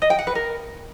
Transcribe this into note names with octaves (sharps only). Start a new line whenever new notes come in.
D#5
G5
F#5
B4
A#4